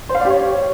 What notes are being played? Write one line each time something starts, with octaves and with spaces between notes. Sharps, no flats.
C5
F5
D5
G4
C#5